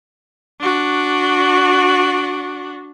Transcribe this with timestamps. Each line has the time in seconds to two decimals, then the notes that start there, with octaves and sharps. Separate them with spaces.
0.61 D4 F#4